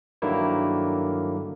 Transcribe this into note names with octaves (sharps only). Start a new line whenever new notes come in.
G2 D3 D#3 F#3 A#3 E4